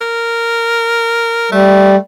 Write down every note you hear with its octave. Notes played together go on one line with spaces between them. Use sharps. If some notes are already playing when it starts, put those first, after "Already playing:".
A#4
G3 A3